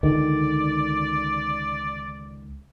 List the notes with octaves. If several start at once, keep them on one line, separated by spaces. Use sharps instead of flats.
C#2 D3 D#3 D5